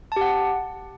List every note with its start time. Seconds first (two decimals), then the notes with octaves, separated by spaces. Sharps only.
0.12 A5
0.16 G4
0.21 F#5